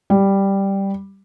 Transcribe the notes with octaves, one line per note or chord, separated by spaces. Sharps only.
G3